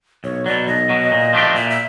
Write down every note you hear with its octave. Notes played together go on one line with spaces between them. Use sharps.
B1 C#5
B2 F#3 D5
B1 D#5
B2 F#3
A#2
F3 A3 D4 G4
A#2 E5
E5